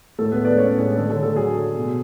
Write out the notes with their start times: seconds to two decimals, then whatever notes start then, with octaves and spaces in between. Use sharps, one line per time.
0.19 A2 A3 A4
0.32 B3 B4
0.39 G#3
0.45 D4 D5
0.58 G#3 C#4 C#5
0.77 A2 G#4
0.96 D3 A3 A4
1.10 A3 A4
1.16 D3
1.23 A3 A4
1.35 F#3 G#4
1.55 A3
1.74 B2